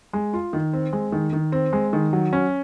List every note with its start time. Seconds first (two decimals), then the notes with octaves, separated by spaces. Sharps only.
0.13 G#3
0.33 F4
0.53 D#3
0.73 C4
0.93 G#3
1.12 D#3
1.33 D#3
1.52 C4
1.73 G#3
1.93 D#3
2.13 F#3
2.33 C#4